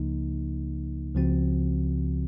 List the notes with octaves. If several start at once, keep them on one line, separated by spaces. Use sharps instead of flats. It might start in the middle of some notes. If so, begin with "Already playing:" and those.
Already playing: C#2 C#3 F3 A#3 D#4
C#2 C#3 F3 C4 F#4